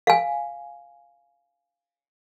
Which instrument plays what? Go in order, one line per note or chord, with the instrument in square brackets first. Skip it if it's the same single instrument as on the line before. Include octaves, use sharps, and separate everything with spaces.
[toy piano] F5 G#5